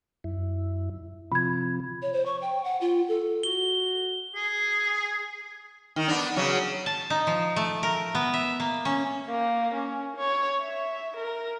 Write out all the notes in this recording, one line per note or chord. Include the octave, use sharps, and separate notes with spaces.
F#2 E4
C3 F3 B5 G#6
C#5
C5
C#6
G5
F#5
F4
A4
F#4 G7
G#4
D#3
B3 D4
C#3 F#3
A5
D#4
F3
A3
A#4
B3
E5
A#3
C#4
A#3
C#4
C#5
E5
A#4